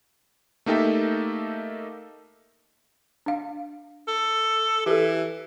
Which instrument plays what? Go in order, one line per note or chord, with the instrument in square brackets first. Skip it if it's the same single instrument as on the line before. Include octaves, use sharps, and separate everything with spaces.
[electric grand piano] A3 A#3 D#4 G4 A4 E5
[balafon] D4 F5
[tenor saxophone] A4
[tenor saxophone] E3 [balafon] G4 A4